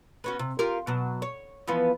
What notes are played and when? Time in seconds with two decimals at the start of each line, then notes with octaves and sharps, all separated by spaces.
0.24 B3 C#4 F#4
0.39 C3
0.59 F4 G4 A#4
0.87 B2 F#3
1.22 C#5
1.67 E3 F3 B3